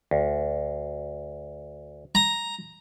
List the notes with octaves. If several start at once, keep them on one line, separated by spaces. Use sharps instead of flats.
D2
A#5